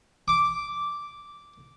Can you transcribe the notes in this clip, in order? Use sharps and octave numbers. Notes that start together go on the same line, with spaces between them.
D6